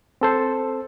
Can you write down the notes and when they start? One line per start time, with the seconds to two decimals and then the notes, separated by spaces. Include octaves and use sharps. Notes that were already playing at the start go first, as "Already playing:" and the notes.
0.21 C4 A4 C5